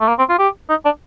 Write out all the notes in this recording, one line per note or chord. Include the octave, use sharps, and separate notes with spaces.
A3
A#3
C4
F4
G4
D#4
D4